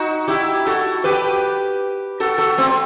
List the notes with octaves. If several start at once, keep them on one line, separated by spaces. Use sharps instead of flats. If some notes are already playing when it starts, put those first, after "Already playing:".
Already playing: D#4 F#4
E4 G4
F#4 A4
G4 B4
F#4 A4
F#4 A4
A3 C4